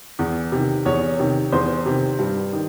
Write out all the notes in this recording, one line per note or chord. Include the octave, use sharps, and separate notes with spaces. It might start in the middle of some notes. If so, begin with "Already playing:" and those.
E2
C3 D#3
E2 C#5
C3 D#3
E2 C5
C3 D#3
G2
D#3